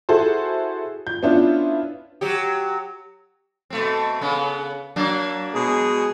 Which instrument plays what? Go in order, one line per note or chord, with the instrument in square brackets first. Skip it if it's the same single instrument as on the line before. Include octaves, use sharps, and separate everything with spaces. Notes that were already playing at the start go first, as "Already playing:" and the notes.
[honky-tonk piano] E4 F#4 G#4 A4 C5
G6
B3 C#4 D4 E4 F4
[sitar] F#3 G4
B2 A3 C4
C#3 B3
F#3 A#3 D4
[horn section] B2 G#3 G#4